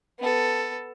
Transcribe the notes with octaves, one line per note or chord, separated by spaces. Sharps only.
B3 A4